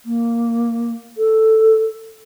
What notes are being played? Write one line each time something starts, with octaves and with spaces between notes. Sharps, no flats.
A#3
A4